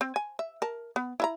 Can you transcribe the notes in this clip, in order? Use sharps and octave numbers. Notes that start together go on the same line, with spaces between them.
C4
G#5
E5
A#4 A5
B3
E4 E5 A#5